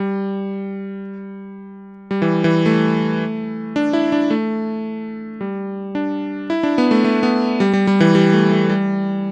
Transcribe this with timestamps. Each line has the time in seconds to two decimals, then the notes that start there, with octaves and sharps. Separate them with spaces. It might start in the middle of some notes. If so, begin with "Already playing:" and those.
Already playing: G3
2.11 G3
2.22 E3
2.44 E3
2.66 A3
3.76 D4
3.93 E4
4.12 D4
4.30 A3
5.41 G3
5.95 D4
6.50 E4
6.63 D4
6.78 B3
6.91 A3
7.04 A3
7.23 B3
7.60 G3
7.73 G3
7.87 G3
8.00 E3
8.15 G3
8.33 A3
8.51 A3
8.70 G3